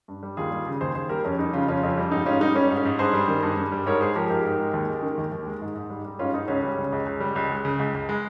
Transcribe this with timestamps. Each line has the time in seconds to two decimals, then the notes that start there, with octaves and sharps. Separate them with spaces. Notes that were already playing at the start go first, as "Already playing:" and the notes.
0.08 G2
0.23 G3
0.37 D#2 F4 G#4
0.52 G3
0.67 C#3
0.81 D#2 G#4 C5
0.95 D#2 G#4 C5
1.09 G3 G4 A#4
1.25 F2 C#4
1.39 G3 D#4
1.53 C#3 C#4 F4
1.68 F2 C#4 F4
1.83 F2
1.97 G3
2.11 G#2 D#4
2.26 G#2 C#4 F4
2.41 G3 D#4
2.55 G3 C#4
2.70 G#2
2.77 C#4
2.85 G#2
2.99 G2 G#4 C5
3.13 G3
3.28 D#3
3.43 G2
3.57 G2
3.72 G3
3.86 G#2 A#4 C#5
4.01 G#3 G#4 C5
4.15 F3 G4 A#4
4.30 G#2 G4 A#4
4.45 G#2
4.59 G#3
4.74 D#2
4.89 G#3
5.02 D#3
5.18 D#2
5.32 D#2
5.46 G#3
5.61 G#2
5.75 G#2
5.90 G3
6.05 G3
6.19 G#2 C#4 F4
6.34 G#2 D#4
6.48 C#2 C#4
6.63 G3
6.77 C#3
6.92 C#2
7.06 C#2
7.20 G3
7.36 C#2
7.50 G#3
7.65 C#3
7.79 C#2
7.94 C#2
8.09 G#3